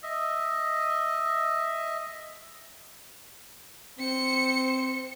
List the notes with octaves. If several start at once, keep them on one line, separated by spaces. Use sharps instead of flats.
D#5 E5
C4 C5 C#7